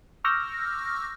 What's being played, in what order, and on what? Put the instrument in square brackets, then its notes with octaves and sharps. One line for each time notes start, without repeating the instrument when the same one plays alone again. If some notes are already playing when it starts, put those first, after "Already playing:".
[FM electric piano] C#6 D6 E6 F6 G6 A#6